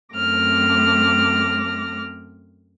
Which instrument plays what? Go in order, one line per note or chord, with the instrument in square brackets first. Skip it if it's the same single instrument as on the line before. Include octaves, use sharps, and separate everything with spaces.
[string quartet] F#2 A3 C4 D6 F6 A#6